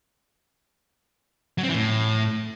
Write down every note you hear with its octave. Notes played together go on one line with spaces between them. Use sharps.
F#3
C4
E3
A2